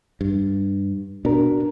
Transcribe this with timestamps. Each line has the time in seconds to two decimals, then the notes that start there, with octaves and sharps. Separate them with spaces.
0.21 G2
1.25 B2 D4 A#4